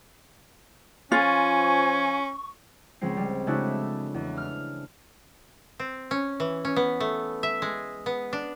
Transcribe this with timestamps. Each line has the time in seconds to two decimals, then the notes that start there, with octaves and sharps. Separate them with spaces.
1.12 F3 C#4 F4 G#5 C#6
3.01 C#2 F3 G#3 C4 C7
3.17 G3
3.47 C#3 G#3 A3 D4 E4 F#4
4.14 E2
4.37 F6
5.80 C4
6.11 C#4
6.40 E3
6.65 C#4
6.76 B3
7.00 A3
7.43 E5
7.62 G#3
8.06 B3
8.33 D4